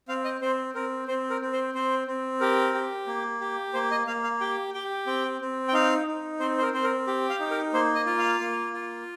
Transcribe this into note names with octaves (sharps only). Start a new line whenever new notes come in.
C4 F5
D#5
C4 C5
C4 A#4
C4 C5
A#4
C4
C5
C4 C5
C4
G4 A#4
G4
A#3
G4
A#3 C5
D#5
A#3 F5
F5
G4 G5
G4 G5
C4 G5
C4
G5
D#4 F5
D#4
C4 C5
C5
A#4
C4 C5
A#4
G4
F5
D#4
A#4
A#3 C5
D#5
F4
F5
A#3
F4